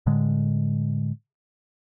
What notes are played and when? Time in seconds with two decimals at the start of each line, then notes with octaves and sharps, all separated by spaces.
0.06 A2 D3 G#3